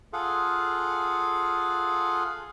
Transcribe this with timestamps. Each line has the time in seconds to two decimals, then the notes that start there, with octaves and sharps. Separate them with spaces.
0.13 F4 G#4 A4 F5 F#5